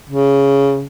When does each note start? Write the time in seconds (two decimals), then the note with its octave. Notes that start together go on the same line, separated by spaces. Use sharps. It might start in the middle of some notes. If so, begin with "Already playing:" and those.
0.10 C#3